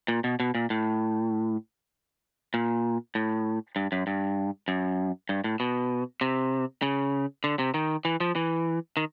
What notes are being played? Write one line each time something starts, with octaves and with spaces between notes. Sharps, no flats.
A#2
B2
B2
A#2
A2
A#2
A2
G2
F#2
G2
F#2
G2
A2
B2
C3
C#3
D3
C3
D#3
E3
F3
E3
D#3